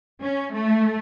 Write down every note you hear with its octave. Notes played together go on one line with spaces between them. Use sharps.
C#4
A3